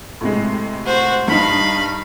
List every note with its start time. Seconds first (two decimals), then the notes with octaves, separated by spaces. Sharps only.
0.21 A2 C3 G#3
0.86 F#4 C5
1.28 G2 D#4 F5 B5